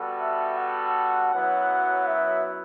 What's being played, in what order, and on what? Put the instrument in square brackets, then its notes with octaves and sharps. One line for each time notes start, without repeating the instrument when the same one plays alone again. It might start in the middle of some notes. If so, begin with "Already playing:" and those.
Already playing: [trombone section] G3 B3 F#4 A4
[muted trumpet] E5
F#5
[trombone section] F#2 F#3 B3 E4 B4 [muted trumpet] F#5
[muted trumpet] E5